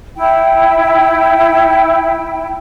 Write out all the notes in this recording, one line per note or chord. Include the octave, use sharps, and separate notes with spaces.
E4 G5